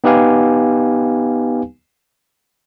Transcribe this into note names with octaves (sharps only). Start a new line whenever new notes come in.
B3 D#4 G4 B4 F5 G#5